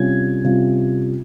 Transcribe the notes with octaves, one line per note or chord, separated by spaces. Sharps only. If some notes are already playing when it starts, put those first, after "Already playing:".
Already playing: C3 G3 C#4 F4 G#6
C3 G3 C#4 F4